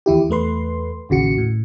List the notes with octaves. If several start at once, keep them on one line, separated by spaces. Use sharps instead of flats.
D#2 E3 E4 G4
E2 A3 B4 C6
A1 D#2 C#3 F#4 C#7
A2